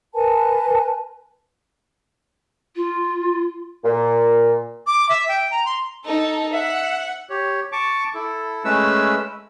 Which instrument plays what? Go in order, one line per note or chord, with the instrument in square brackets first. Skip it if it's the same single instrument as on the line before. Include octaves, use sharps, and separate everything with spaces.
[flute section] A#4 B4 G#5 A5
[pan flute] F4
[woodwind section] A#2
[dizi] D6
E5
G5
A#5
C6
[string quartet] D#4 A4
[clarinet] E5 [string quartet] F#5
[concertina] G4 C#5
A5 C#6 D6
E4 A4
G#3 A3 C#4 B4 E6